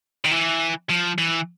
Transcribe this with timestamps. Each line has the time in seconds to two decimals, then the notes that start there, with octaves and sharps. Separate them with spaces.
0.25 D#3
0.31 E3
0.90 F3
1.18 E3